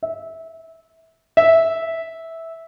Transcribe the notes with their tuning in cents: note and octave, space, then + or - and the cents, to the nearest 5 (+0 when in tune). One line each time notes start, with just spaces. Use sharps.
E5 -20
E5 -10